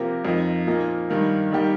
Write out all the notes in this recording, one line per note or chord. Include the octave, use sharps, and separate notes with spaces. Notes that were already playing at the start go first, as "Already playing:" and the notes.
Already playing: C3 F3 A#3 G4 A#4
F2 F3 D#4 A#4
A#2 F3 A#3 D#4
G2 D#3 A#3 D#4
D#3 G3 A#3 D#4 G4